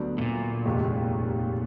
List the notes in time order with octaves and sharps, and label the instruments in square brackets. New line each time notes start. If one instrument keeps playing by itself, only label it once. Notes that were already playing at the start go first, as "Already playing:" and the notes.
Already playing: [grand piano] D2 D3 F#3 B3 D4
[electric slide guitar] A2
A#2
[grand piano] F1 D#2 D#3 G#3